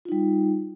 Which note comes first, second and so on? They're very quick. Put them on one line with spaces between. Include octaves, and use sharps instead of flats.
F4 D#4 G3